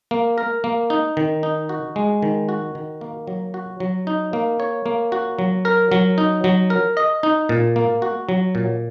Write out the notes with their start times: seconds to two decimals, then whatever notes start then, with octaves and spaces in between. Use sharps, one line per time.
0.11 A#3
0.38 A#4
0.64 A#3
0.90 D#4
1.17 D#3
1.43 D#4
1.69 F#4
1.96 G#3
2.22 D#3
2.49 F#4
2.75 D#3
3.01 A#3
3.27 F#3
3.54 F#4
3.80 F#3
4.07 D#4
4.33 A#3
4.60 C#5
4.86 A#3
5.12 F#4
5.39 F#3
5.65 A#4
5.92 F#3
6.18 D#4
6.44 F#3
6.70 A#4
6.97 D#5
7.23 D#4
7.49 A#2
7.76 A#3
8.02 F#4
8.29 F#3
8.55 A#2